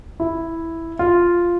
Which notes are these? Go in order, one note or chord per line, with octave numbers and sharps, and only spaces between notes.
E4
F4